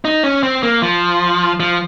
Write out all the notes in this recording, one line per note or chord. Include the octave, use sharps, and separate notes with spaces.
D#4
C#4
C4
A#3
F3
F3